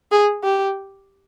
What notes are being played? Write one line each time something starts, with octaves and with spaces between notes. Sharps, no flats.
G#4
G4